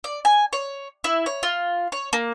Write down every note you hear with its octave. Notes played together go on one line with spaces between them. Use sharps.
D5
G#5
C#5
E4
C#5
F4
C#5
A#3